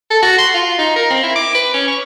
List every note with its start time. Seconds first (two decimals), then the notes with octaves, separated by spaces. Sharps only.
0.11 A4
0.23 F#4
0.39 C6
0.54 F4
0.79 D#4
0.96 A#4
1.10 C4
1.23 E4
1.36 D6
1.55 B4
1.74 C#4
1.87 C#6